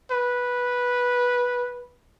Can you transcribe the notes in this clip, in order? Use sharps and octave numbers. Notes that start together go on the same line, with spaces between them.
B4